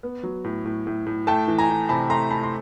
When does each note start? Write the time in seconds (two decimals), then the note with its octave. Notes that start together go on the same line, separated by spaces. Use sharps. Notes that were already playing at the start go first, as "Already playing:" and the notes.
0.03 B3
0.23 F#3
0.44 A2
0.65 A2
0.87 A2
1.06 A2
1.27 A3 G5 A5
1.48 E3
1.58 G#5 A#5
1.70 E3
1.89 C3 A5 B5
2.10 A3 A#5 C6
2.31 C4 A5 B5
2.43 C6